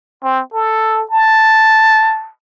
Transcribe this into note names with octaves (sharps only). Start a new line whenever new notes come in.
C4
A4
A5